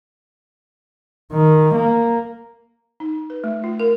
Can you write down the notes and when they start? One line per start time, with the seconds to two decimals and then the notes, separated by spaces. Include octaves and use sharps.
1.33 D#3
1.75 A#3
3.00 D#4
3.30 B4
3.44 A3
3.64 F4
3.80 A#4